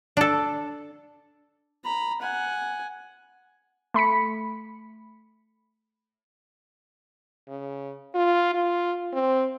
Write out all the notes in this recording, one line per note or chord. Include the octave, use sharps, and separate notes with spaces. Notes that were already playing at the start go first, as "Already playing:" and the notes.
D4 A4
A#5 B5
F#5 G#5
A3 B5 B6 C#7
C#3
F4
F4
C4